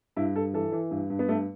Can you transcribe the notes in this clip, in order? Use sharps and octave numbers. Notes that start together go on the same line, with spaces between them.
G2 E4
G2 A4
E3 A4
E3
G2
G2
B3
G2 A3